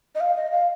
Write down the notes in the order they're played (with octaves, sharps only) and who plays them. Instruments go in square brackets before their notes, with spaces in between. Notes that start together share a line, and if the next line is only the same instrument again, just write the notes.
[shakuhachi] D#5
F5
D#5
F5